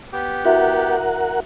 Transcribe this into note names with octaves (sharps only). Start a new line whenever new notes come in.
B3 G4
E4 F#4 A#4 E5 F#5